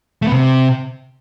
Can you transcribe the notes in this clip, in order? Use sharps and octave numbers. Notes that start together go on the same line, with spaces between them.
A3
B3
C3